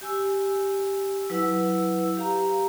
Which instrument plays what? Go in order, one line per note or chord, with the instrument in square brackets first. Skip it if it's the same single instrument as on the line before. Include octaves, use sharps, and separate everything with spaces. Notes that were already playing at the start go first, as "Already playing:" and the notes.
[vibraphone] G4 G#5 E6
F#3 E4 B4 F#5 E6
G4 F5 A#5